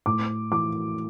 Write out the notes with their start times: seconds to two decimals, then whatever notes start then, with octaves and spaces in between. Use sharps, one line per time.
0.06 A2 D6
0.52 E3 D6